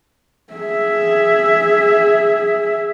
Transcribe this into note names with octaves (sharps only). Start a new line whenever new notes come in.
G#4 E5